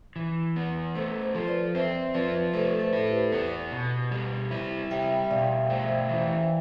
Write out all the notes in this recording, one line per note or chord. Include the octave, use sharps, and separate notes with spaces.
E3
B3
A3 A4 C5
A4 C5
F3
B4 D5
C4 C5 E5
F3 B4 D5
A3 A4 C5
A4 C5
E4
G4 B4
B3
B2
G3
E4
G3 E5 G5
E5
B2 D5 F5
A3 C5 E5
E3